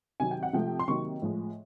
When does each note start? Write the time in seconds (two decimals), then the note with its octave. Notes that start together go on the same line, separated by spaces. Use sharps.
0.20 C3 D#3 F#3 G#5
0.31 G5
0.43 F#5
0.53 C3 F3 A3 G5
0.79 C6
0.88 C3 D#3 F#3 A#3 C#6
1.22 A2 F3 G#3